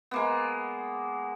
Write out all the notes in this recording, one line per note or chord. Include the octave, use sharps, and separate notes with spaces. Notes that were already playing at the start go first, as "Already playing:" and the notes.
G#3 A#3 B3